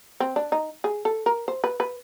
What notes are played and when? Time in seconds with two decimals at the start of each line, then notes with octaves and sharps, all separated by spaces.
0.20 C4
0.36 D4
0.52 D#4
0.84 G#4
1.05 A4
1.26 A#4
1.48 C5
1.64 B4
1.80 B4